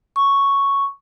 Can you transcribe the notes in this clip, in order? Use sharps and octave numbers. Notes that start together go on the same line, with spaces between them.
C#6